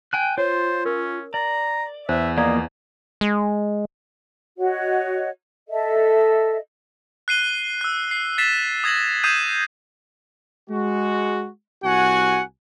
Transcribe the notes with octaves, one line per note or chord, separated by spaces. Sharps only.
G5 G#5 F#6
F4 C5 C#5
C#4 A#4
D5 A#5
E2 C5 E5
F3 A#3 D5 D#5 F5 A#5
G#3
F#4 C#5 D#5 F#5
A4 D#5 E5
F#6 C7 D#7 G7
E6 F#6
C7
A6 B6 C7 E7
D#6 G#6 A#6 F#7
D#6 G6 G#6 C7 D#7 E7
G#3 F#4
C2 F#4 F#5 G#5